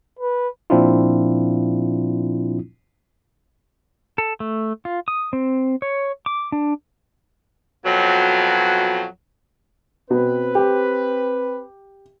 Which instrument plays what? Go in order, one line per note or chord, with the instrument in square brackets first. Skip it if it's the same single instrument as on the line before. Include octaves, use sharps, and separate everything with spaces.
[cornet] B4
[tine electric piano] A#2 F3 C4 D4 E4 F4
[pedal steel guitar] A4
A3
F4
D#6
C4
C#5
D6
D4
[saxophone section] F2 B2 F#3
[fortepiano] B2 [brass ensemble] C4 B4
[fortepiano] G4